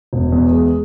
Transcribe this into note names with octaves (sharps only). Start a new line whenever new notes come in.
E1
E2
G#3